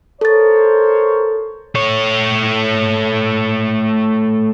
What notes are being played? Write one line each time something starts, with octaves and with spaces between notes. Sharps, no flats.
A4 A#4 C5 C#5 A6
A3 C#5